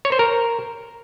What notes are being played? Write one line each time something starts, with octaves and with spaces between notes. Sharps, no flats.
C#5
C5
A#4